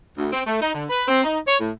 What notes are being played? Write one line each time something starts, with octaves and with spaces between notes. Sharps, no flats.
D2
C4
A3
D#4
D3
B4
C4
D#4
C#5
A2